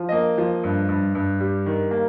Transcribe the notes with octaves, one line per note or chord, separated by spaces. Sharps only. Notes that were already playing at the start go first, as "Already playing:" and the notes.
Already playing: F3
A#3 D#5
F3
G2
G2
G2
G3
D#3
A#3